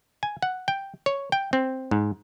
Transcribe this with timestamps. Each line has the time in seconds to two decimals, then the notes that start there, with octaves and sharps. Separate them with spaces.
0.23 G#5
0.42 F#5
0.68 G5
1.06 C#5
1.32 G5
1.53 C4
1.91 G#2